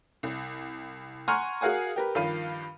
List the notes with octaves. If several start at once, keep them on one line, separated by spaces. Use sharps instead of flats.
C2
F#5 G#5 A#5 C6 C#6 F6
F#4 G#4 A#4 F5 F#5 G#5
G4 A#4 B4
G2 D#3 F3 F5 B5 D#7